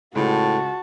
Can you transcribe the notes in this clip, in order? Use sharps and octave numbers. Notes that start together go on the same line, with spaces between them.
C#2 A2 F#4 A5